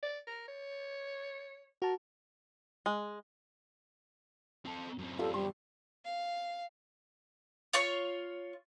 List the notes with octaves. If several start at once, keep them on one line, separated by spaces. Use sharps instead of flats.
D5
A#4
C#5
F#4 A#4 A5
G#3
C4 A4
F#2 C4
F4 G4 A4 D5
G3 C6
F5
F4 C#5 C#6